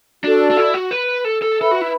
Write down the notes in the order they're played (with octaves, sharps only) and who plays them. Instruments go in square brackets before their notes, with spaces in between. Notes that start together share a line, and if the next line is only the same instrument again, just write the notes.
[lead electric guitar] D4 [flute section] F#4 A4 D5
[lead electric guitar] D4
E4
F#4
B4
A4
A4
[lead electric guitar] A4 [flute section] B4 E5 B5
[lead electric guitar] F#4
E4